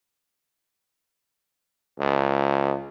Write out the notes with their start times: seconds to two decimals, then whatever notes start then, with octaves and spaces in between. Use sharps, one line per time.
2.00 C#2